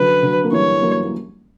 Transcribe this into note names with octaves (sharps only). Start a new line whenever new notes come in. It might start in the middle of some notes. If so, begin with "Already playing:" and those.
Already playing: D3 F#3 B4
D3 F#3
A#3
E3 G3 C#5
F#3 A#3
A#3